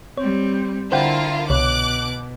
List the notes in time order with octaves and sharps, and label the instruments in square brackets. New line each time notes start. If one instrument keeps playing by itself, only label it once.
[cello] G3 C4 [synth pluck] C#5
[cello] D3 [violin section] E4 F4 A#4 [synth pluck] C5 F#5 G5
[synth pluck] C2 C#5 [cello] B2 [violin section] D6 F#6